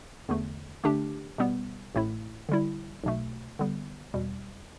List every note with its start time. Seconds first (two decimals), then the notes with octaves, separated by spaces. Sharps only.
0.29 E2 D3 A3
0.84 D3 A3 D4 G4
1.38 B2 G3 B3
1.95 A1 A2 A3 E4
2.49 D3 G3 E4
3.04 B1 B2 A3
3.59 D3 G3 B3
4.14 E2 B2 G3